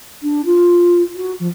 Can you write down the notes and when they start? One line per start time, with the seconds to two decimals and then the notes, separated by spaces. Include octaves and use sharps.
0.22 D4
0.45 F4
1.15 F#4
1.39 F3